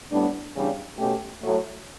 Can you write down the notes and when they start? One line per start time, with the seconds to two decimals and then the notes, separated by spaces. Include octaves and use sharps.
0.09 A2 G3 B3 D4
0.53 E2 C#3 G3 D4
0.97 B2 A3 C#4 G4
1.40 A2 F#3 A3